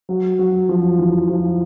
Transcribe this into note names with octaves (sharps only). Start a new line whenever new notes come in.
F#3
F#3
F3
E3
F3